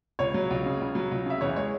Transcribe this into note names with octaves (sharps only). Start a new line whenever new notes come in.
C#2 C#5
F#3
C#2
C#3
C#2
F#3
C#2
C#3 E5
E2 C#5
G#3 C#5